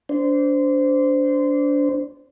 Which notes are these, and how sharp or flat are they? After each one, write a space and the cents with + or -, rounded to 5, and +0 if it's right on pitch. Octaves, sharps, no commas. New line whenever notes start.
D4 -25 C5 -20